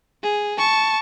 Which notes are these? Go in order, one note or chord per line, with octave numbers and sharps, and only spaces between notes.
G#4
A5 C#6